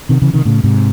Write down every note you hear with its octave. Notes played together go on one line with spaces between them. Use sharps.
C3 D#3
C#3 E3
C3 D#3
A2 C#3
G#2 C3